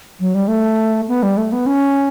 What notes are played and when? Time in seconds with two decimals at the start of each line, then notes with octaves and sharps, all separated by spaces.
0.20 F#3
0.34 G3
0.48 A3
1.08 B3
1.23 G3
1.37 A3
1.52 B3
1.66 C#4